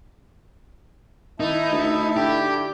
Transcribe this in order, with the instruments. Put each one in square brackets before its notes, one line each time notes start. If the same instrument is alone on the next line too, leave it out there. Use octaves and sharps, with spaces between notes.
[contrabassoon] D#3 [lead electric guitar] D#4 [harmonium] E4 E5 A5
[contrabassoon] D2
[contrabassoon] D3 [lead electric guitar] G4